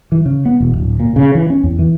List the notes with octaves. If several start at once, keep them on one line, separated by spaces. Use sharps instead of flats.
E3
C#3
B3
E1
D1
A#2
C#3
E3
C#4
E2
E3